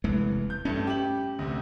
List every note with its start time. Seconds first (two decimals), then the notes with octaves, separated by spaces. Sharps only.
0.04 F1 E2 G#3 A3
0.50 G6
0.65 G2 A3 C#4
0.87 G4 F#7
1.39 D2 C3